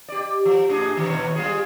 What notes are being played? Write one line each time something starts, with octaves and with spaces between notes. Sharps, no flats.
G4 D5
F3
A2 D4 G#4
C3 D#3 E3
D#2 B2 C#5
G3 F4 G#4